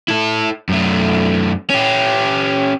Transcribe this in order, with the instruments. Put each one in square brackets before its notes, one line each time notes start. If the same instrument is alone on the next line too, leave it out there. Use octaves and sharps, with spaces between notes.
[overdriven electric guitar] E4 A4
F#2 A3
C#4 G4